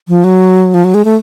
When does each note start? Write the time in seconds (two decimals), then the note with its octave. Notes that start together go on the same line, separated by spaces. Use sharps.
0.08 F3
0.24 F#3
0.74 F3
0.84 F#3
0.94 G#3
1.05 A3